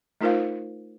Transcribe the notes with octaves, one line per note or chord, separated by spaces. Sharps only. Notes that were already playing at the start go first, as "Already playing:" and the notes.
A3 D#4 F4 A#4 C5 F5